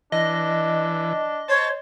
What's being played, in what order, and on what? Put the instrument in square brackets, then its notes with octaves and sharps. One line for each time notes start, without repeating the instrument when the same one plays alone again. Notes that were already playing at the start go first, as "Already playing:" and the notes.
[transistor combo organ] E3 [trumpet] D4 [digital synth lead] D#5
[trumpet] C5 [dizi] C#5 [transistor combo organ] A5